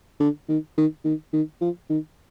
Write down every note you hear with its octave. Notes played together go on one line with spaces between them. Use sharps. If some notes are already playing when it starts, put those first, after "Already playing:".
D3
D#3
D#3
D#3
D#3
F3
D#3